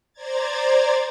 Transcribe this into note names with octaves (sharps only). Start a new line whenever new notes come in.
C5 D5 A#5 G#6 A6